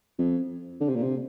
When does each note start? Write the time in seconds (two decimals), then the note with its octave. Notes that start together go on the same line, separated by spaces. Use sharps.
0.18 F2
0.80 D3
0.89 C3
0.96 A#2
1.03 C3